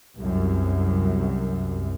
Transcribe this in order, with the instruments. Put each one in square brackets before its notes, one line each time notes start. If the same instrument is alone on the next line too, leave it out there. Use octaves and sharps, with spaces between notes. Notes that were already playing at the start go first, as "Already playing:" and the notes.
[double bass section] C2 F#2